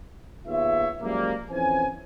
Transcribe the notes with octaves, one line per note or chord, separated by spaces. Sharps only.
D#2 B3 F4 G#4 C#5 E5
F#2 F3 G3 G#3 A#3
F2 E3 C#4 C5 G#5